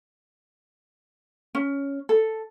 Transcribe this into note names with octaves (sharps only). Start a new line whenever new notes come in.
C#4
A4